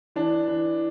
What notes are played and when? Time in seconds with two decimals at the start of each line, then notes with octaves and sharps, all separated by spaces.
0.16 E3 D4
0.48 E3